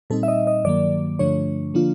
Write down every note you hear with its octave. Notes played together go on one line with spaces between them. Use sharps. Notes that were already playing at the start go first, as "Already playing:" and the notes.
A#2 G3 C4 D#4 A4
E5
D#5
D#5
G2 D#3 F#3 A#3 D5
G2 D3 F3 A3 D4 C#5
D3 F3 A#3 D4 F4